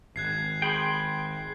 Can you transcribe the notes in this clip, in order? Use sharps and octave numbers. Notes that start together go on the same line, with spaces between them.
G#1 F#6 G#6 C7
G#4 G5 B5 C6